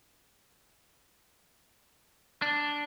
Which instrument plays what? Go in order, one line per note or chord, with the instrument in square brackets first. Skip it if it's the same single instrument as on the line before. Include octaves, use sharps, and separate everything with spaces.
[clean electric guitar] D4